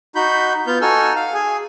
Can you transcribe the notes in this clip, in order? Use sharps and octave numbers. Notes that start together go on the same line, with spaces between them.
D#4 F#4 B5 G6
B3 F4 G6
D#4 F#4 A4 G#5 E6 F6
F5
G#4 G#5